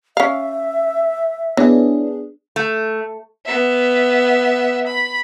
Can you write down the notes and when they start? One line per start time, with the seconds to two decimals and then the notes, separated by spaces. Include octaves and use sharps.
0.17 C#4 E5 F5
1.57 E3 B3 D4 G#4 C#5 D5
2.56 A3
3.46 B3 E5
4.86 B5